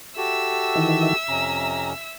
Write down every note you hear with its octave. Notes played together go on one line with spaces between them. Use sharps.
F#4 G4 A4 E5 E6
D#3 E3
F2 C3 C#4 A#5